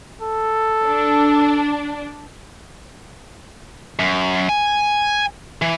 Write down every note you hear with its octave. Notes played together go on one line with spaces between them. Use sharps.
A4
D4
F#2
G#5
E3